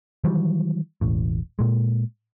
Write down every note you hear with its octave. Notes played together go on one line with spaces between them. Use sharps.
D#3 E3 F#3 G3
E1 A1 A2
A#2 G#3